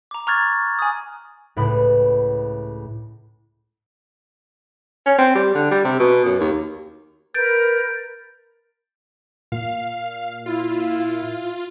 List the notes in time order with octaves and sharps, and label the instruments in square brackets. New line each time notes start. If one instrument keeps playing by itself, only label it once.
[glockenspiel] A#5 D6
A#5 C#6 F6 F#6 G#6 A6
G#5 D#6
[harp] C#2 A2 E4 B4 B5
[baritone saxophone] C#4
C4
G3
D3
G3
C3
B2
F#2
D#2
[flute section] A#4 B4 [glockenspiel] G6 A6 D7
[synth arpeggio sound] A#2 [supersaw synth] F5
[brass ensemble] E4 [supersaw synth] F4